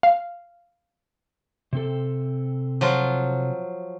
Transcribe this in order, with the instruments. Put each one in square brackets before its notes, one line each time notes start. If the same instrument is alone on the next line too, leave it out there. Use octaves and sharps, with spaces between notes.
[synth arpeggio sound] F5
[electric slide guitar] C3 C4 A4
[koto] F3 F#3 F4